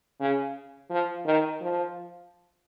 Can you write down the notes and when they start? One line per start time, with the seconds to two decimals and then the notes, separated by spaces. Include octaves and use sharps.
0.20 C#3
0.90 F3
1.25 D#3
1.61 F3